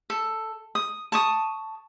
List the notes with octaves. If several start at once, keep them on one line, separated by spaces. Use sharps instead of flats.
A4
D#6
A5 C#6 D#6